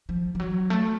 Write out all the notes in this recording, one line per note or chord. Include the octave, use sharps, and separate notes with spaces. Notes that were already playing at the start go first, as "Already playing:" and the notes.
F3
F3
F#3
A3